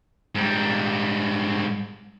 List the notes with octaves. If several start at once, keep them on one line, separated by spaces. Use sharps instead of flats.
G#2 G3